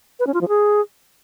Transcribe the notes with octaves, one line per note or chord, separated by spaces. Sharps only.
B4
C#4
F4
F3
G#4